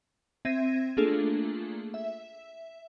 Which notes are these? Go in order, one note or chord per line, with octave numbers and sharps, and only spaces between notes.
C4 E5 G#6 A#6 D#7
A3 A#3 D4 F4 G#4 A4
E5